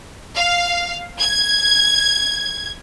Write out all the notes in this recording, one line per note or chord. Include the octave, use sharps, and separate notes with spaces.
F5
G#6